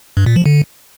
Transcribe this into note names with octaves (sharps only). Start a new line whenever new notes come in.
G2
A#2
F3
D3